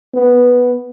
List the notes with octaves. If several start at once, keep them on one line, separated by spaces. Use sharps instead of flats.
B3